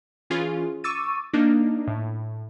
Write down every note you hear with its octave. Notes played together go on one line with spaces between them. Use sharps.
E3 C#4 F4 G#4
C#6 D6 E6 A6 D#7
A#3 D4 D#4
A2